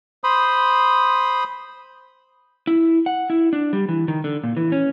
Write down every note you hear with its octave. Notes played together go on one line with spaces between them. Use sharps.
C5 B5 C6 D#6
E4
F#5
E4
D4
G3
E3
D#3
D3
A#2
E3
C#4